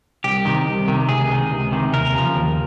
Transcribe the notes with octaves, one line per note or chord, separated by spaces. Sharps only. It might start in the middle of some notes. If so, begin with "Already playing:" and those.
C2 G4
C3 D#3
C2
C3 D#3
C#2 G#4
C3 D#3
C#2
C3 D#3
D#2 A#4
C#3 F3
D#2